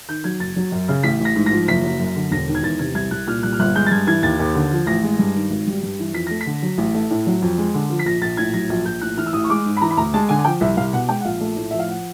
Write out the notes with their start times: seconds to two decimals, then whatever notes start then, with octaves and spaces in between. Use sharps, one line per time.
0.08 D#3 G6
0.24 F#3 G#6
0.40 F#1 A6
0.56 F#3
0.72 F#2
0.89 C#3
1.03 A1 B6
1.20 A1
1.25 A#6
1.35 G#2
1.46 A#6
1.52 F3
1.68 F#1 B6
1.84 F#3
1.99 F#2
2.16 D3
2.31 E1 A#6
2.48 D#3
2.55 G#6
2.63 E2 A6
2.79 C3 G#6
2.95 C2 G#6
3.11 C2 F#6
3.27 A#2 F6
3.43 G3 F#6
3.53 F6
3.59 G1 F#6
3.75 G#3 G6
3.86 A6
3.91 G2 G#6
4.07 E3 G#6
4.23 D#2 A6
4.39 D#2
4.55 D3
4.71 F3
4.87 A1 A#6
5.03 G#3
5.19 G2
5.35 D#3
5.50 G#1
5.67 G3
5.83 G2
5.99 E3
6.14 F2 B6
6.27 A3 A#6
6.41 B6
6.46 D3
6.63 F#3
6.78 A1
6.94 A3
7.10 A2
7.27 F#3
7.42 F2
7.58 G#3
7.74 D3
7.90 F3
7.99 B6
8.05 A#1 A#6
8.22 A#1 A6
8.37 A2 G#6
8.54 F#3 A#6
8.70 A#1 G#6
8.85 A#1 G6
9.01 A2 F#6
9.17 E3 F6
9.26 E6
9.33 A1 D#6
9.44 C#6
9.50 G#3 D6
9.65 G#2
9.77 B5
9.81 E3 A#5
9.91 B5
9.97 D2 A#5
10.14 G#3 A5
10.29 D3 G#5
10.39 G#5
10.45 F3 G5
10.61 C2 E5
10.77 C2 F5
10.93 B2 F#5
11.09 G#3 G5
11.20 F#5
11.25 A#1 F5
11.41 A3
11.57 A2
11.71 F3 E5
11.79 F5
11.89 F#5